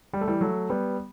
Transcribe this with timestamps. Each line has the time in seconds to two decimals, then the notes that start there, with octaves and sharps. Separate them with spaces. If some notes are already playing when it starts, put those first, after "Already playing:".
0.13 G3
0.21 A3
0.28 E3 G3
0.41 F#3 A3
0.70 G3 B3